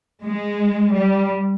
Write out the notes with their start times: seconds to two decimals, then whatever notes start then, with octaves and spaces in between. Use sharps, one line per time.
0.23 G#3
0.94 G3